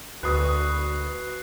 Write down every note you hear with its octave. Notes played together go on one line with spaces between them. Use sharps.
D2 F#4 B4 D#6 F#6 C7